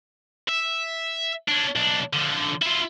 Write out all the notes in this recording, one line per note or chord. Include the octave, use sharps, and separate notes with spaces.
E5
C#4 D4
B1 D4
D3 F3
E4 F4